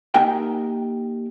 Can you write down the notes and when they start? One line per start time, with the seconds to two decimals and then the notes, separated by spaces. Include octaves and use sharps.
0.14 A#3 D#4 G4 A#4 E5 G5